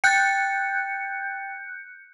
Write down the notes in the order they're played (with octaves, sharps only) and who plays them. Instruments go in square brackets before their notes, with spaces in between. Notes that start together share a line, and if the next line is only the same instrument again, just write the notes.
[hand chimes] G5 A6 [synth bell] F#6 G6 C#7